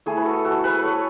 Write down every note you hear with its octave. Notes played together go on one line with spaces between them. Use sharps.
A3 E4 G#4
B4
F#4 A4
F#4 A4
G#4 B4
A4 C#5